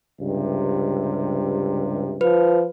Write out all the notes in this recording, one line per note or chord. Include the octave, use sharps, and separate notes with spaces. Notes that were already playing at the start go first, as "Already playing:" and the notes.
C#2 G2 C3
F3 B4